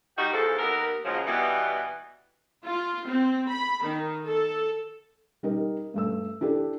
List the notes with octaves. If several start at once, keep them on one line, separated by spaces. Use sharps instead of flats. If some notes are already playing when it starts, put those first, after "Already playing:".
G3 D#4 F#4 G4
E2 G#2 F3 A4
D#2 B3 A#4
A#2 C#3 F3 F#3 G#3
B2 E3 G3 B3
F4
C4
B5
D#3
A4
G3 D#4 A#4
G2 A3 E6
D4 E4 G4 A4